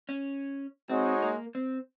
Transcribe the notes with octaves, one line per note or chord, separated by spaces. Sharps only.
C#4
G#3 C4 D#4 F#4 C#5
A#3
C4